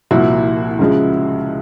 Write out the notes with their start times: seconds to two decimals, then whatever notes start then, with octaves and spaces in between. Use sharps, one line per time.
0.11 C2 A#2 F3 E4 F#4
0.79 C#2 C#3 F3 G#3